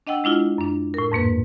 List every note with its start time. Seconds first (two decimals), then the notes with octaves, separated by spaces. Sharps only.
0.07 D4 D#5 F#5 G5 E6
0.24 G#3 D4 E4 F4
0.58 F#2 D4
0.94 A2 A#4
1.12 F2 G#2 A#3 B4